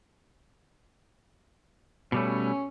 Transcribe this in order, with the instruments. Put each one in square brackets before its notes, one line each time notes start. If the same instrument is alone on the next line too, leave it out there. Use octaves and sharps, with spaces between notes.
[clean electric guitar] B2 G3 A3 [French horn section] C#4